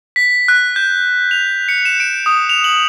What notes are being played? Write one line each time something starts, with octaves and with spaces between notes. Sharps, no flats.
B6
F#6
G6
F7
C#7
E7
D7
D#6
F7
F#7